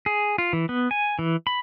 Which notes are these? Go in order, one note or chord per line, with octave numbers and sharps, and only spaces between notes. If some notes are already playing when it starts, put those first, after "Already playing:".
G#4
F4
E3
B3
G#5
E3
B5